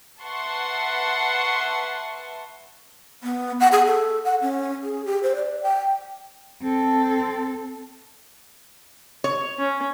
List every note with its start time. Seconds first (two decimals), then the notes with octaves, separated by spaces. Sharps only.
0.22 B4 E5 F#5 A5 C6 C#6
3.23 B3
3.60 F#5
3.72 G#4
3.86 A4
4.25 F#5
4.41 C#4
4.83 G#4
5.06 G4
5.23 C5
5.36 D5
5.63 G5
6.63 C4 A4
9.24 C#5
9.59 C#4